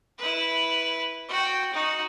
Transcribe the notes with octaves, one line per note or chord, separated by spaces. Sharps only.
E4 B4
F#4 G5
D#4 F#4